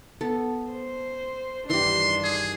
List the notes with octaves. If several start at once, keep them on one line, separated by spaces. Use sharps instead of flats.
B3 A4
C5
G2 D#3 E3 D4 G4 C6
G#4